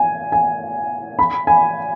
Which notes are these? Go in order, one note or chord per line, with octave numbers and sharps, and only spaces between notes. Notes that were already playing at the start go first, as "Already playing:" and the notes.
Already playing: G#5
G#5
B5
G#5